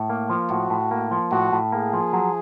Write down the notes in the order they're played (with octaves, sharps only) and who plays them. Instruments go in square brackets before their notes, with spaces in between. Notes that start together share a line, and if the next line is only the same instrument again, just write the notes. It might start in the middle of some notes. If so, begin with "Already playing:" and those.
Already playing: [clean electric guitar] A2
A#3
F3
[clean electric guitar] A2 [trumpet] F#4
[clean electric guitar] A2
A#3
F3
[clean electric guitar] A2 [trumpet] F#4
[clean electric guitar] A2
[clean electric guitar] A#3 [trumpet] G#4
[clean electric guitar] F3
F#3